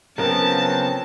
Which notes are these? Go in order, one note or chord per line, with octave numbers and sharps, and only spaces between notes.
C#3 F3 F#3 B3 C4 A#4 A5